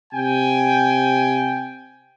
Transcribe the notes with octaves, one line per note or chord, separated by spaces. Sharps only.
C3 G5 G#5